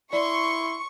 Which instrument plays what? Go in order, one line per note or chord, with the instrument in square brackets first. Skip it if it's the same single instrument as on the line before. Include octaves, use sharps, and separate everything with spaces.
[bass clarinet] E4 [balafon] D5 [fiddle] C6 [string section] C#6